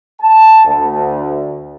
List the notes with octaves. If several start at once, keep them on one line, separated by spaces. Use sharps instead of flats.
A5
D2